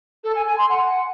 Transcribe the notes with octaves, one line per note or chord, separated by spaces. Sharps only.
A4
G#5
G#5
C6
F#5